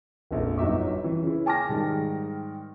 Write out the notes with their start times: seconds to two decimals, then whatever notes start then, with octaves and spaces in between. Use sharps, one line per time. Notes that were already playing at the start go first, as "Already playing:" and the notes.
0.31 F1 A#1
0.58 G1 F#3 D#4 E5 D6
1.04 E3
1.22 C#3 E4
1.46 G#5 A5 D6 F6 A#6
1.69 G#2 D#3 G3